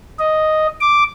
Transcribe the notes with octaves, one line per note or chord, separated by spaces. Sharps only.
D#5
D6